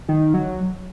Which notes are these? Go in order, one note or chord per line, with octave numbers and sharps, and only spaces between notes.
D#3
F#3